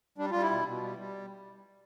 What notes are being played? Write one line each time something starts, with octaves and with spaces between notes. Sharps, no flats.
G3 D4
G3 F4
E4
B2
B2
G3
G3